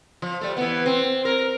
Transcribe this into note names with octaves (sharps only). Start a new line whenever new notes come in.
F3
G3 A3
E3 B3
C4
A#4